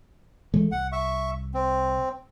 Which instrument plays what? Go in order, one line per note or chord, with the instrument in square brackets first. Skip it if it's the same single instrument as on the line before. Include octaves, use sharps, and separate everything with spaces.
[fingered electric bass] E3 G#3 A3
[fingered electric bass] C2 [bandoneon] F#5
[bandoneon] E5 C#6
C4